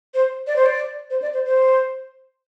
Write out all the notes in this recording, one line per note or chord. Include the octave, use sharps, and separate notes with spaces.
C5
D5
C5
D5
C5
D5
C5
C5